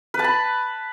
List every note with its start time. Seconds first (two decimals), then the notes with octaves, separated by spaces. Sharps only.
0.14 B4
0.19 A5
0.24 B5